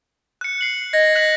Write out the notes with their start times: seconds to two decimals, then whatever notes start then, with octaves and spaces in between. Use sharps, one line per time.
0.41 F#6 C#7
0.61 C7 F#7
0.93 D#5 G#6 A#6
1.15 F#6 B6 F#7